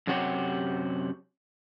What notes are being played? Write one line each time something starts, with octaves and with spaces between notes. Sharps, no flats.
F#2 C3 F#4 G4 C#5